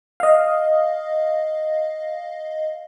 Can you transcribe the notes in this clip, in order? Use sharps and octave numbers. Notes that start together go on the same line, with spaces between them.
D#5 F5